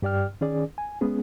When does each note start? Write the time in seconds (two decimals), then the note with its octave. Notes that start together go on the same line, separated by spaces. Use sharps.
0.02 G2 G4 D5 G5 F6
0.41 D#3 C#4 G#4 D5
0.78 G#5
1.01 G#3 B3 C#4 G#4